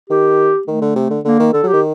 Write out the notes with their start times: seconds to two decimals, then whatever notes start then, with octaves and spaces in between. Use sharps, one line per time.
0.10 D#3 G4
0.67 D#3 A3
0.82 D3
0.96 C3
1.10 D3
1.25 D3 A#3
1.40 D#3
1.53 D3 A4
1.64 F#3
1.68 G4
1.73 D#3